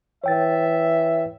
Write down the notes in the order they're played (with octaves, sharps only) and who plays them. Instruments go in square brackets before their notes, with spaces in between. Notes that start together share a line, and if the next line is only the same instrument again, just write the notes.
[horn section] E3 E5 [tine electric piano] C#5 G5 A6